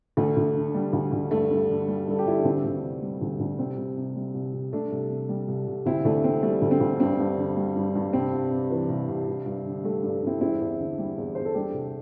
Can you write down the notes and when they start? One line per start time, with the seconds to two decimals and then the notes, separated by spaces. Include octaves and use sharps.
0.17 D2 A3
0.37 D2
0.55 D3
0.75 G3
0.93 D2
1.12 D2
1.31 G2 A3
1.51 G2
1.70 D3
1.88 G3
2.07 G2 A4
2.19 G4
2.25 G2 E4
2.36 D4
2.44 D2 C4
2.64 D2
2.83 C3
3.02 G3
3.21 D2
3.40 D2
3.59 C2 C4
3.77 C2
3.97 C3
4.16 G3
4.34 C2
4.53 C2
4.72 C2 A3 D4
4.92 C2
5.10 C3
5.29 G3
5.48 C2
5.67 C2
5.86 D2 C4 E4
6.05 D2 A3 D4
6.24 D3 C4
6.43 G3 A3
6.62 D2
6.71 C4
6.80 D2
7.00 G2 C4
7.19 G2
7.38 D3
7.56 G3
7.76 G2
7.95 G2
8.13 C2 C4
8.33 C2
8.51 C3
8.71 E3
8.89 C2
9.09 C2
9.27 G2
9.46 G2
9.65 D3
9.84 G3 A3
10.03 G2
10.23 G2 C4 E4
10.41 E2 C4 E4
10.61 E2
10.79 D3
10.98 G3
11.17 E2
11.35 E2 C5
11.45 A4
11.54 G3 D4 G4
11.73 C2